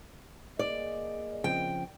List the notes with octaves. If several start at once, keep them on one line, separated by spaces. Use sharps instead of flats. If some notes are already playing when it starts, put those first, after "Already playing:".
A#3 G#4 D5 D#5
C#3 F3 C4 G5